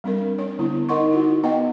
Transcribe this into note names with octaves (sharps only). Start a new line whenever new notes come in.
G3 C4 D4 A#4
D4 C#5
D3 B3 E4
D#4 A#4 D#5 F#5 C6 C#6
D#4 E4 F#4
B3 B4 D#5 F#5 G5